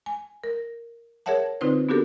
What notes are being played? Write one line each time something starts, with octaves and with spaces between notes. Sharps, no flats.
G#5
A#4
G#4 A#4 C#5 E5 F#5 A5
D3 C4 D#4 F4 B4 C5
B3 D4 F#4 G4 A4 A#4